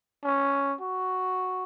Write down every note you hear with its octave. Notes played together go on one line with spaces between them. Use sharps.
C#4
F#4